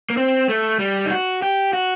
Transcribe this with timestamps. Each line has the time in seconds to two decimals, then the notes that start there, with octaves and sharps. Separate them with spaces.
0.10 A#3
0.17 C4
0.49 A3
0.79 G3
1.06 D#4
1.11 F#4
1.42 G4
1.73 F#4